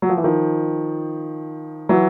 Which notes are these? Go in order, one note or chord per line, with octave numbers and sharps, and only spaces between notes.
F#3
F3
E3
D#3 F3
E3 F#3